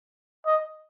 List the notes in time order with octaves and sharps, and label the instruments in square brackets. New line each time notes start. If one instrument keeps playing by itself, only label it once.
[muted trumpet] D#5